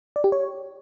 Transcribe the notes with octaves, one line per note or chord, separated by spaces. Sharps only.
D5
G4
C#5